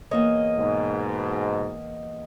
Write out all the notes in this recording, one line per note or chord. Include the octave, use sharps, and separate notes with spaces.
E2 A#3 C#5 D#5
G#2 B2